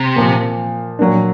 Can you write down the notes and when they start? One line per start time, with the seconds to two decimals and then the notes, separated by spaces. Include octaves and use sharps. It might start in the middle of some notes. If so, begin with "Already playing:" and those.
Already playing: C3
0.16 A#2 F3 A#3
0.99 A#2 F#3 A#3 D4